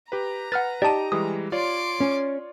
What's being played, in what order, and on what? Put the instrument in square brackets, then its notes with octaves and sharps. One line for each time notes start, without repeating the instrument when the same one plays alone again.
[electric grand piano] G4 B4 [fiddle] A#5
[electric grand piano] B4 [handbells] F#5 F6 A6
[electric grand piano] D#4 D#5 D#7 [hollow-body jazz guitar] G4 [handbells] D5 A5
[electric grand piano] E3 G3 G#3 [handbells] D#6
[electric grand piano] F4 C#5 D5 [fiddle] C6 D6
[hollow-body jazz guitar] C#4